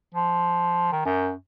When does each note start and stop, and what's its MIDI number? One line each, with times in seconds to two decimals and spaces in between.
0.15 0.87 53
0.92 1.03 51
1.05 1.30 42